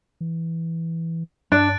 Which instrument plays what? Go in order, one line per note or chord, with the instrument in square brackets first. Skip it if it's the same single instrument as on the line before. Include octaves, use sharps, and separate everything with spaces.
[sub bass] E3
[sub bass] G2 [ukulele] D4 [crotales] F#6 A6 D7